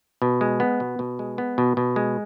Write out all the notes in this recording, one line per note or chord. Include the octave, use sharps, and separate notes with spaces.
B2
G#3
B3
B2
B2
G#3
B3
B2
B2
G#3